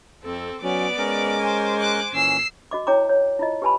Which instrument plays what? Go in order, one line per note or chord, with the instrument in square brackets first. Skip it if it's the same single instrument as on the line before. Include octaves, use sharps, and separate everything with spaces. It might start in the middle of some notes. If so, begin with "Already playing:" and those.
[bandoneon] F2 [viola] C4 A4
[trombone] F#3 [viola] B3 D5 [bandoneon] C#4 [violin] D6
[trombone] G#3 [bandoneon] C#4 A#4
[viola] C5 G#5
[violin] D6 F#6
[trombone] A#2 [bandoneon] E3 C#4 [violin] E6 C7
[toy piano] F#4 D#5 D6
E4 C#5 G5 A#5 D6
C#5
E4 F4 D#5
G4 B4 G#5 A5 B5